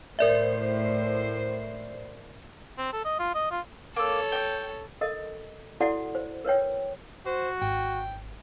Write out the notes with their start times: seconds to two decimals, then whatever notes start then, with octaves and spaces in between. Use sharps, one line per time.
0.19 A2 A#4 C5 D5 E5
2.78 C4
2.93 A4
3.05 D#5
3.19 F4
3.35 D#5
3.51 F4
3.96 A#3 A4 C#5 E6
4.32 G5 G6
5.01 A4 A#4 D#5
5.80 E4 F#4 A4 D5 F#5
6.15 C5
6.45 A#4 B4 C#5 G5
7.26 F#4 C5
7.62 G#1 G5